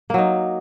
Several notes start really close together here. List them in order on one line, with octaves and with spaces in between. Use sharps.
A#3 F#3 D#4